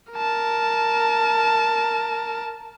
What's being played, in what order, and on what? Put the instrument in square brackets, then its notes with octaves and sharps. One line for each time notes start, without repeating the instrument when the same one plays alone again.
[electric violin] A#4 A5